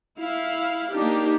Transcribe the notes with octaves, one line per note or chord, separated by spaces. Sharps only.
E4 F5
A#3 D4 D#4 G4